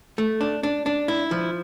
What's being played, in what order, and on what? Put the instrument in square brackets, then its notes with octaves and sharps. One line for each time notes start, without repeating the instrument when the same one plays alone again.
[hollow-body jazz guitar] A3
D4
D4
D4
E4
F3